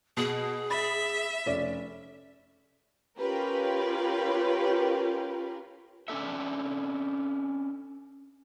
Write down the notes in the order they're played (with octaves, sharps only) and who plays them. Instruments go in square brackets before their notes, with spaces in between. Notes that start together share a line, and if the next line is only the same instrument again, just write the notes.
[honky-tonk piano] B2 [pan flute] G#4
[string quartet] E5 [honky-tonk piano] B5 A6
[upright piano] F1 C#4 D5
[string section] C#4 F4 G4 A#4 B4
[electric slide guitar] C#4 D4 A4 E5